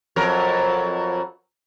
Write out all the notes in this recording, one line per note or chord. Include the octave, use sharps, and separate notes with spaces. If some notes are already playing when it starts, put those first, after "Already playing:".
F2 F#3 A#4